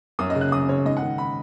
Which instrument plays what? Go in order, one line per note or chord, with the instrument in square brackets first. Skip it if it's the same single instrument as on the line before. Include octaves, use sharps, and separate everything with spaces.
[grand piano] F#2 D#6
D#5
C#3
F#6
F#2 D#6
C#3 C#5
G#2 D#5
F#5
D#3
B5